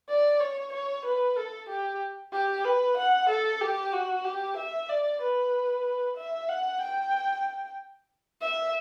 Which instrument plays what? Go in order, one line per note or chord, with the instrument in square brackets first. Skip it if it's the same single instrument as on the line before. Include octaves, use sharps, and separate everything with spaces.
[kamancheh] D5
C#5
C#5
B4
A4
G4
G4
B4
F#5
A4
G4
F#4
G4
E5
D5
B4
E5
F#5
G5
E5